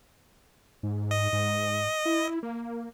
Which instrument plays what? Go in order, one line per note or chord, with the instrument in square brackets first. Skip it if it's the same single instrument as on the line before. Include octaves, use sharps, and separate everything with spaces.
[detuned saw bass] G#2
[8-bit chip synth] D#5
[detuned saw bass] G#2
E4
A#3